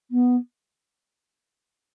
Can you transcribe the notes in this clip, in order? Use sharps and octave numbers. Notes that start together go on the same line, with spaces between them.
B3